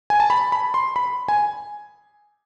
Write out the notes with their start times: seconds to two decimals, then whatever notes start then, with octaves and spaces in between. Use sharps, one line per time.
0.10 G#5
0.20 A5
0.30 B5
0.52 B5
0.74 C6
0.96 B5
1.28 G#5